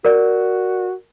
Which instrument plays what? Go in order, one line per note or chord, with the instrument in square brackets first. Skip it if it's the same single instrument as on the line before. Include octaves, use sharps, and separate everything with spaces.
[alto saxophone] F#4 [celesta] A#4 D5